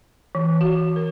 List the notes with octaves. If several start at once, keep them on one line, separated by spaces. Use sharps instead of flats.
E3
F#4
A#4